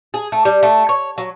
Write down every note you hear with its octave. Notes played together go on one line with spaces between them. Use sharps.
G#4
A3
G3
A3
C#5
F#3